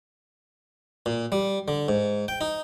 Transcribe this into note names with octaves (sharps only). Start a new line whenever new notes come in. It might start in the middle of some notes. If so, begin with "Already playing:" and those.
A#2
G3
D3
G#2
G5
D#4